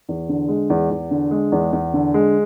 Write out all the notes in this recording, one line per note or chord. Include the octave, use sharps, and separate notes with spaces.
E2
D3
G#3
E2
E2
D3
G#3
E2
E2
D3
G#3